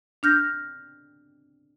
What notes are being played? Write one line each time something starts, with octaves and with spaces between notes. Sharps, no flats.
D4 F6 G6 A#6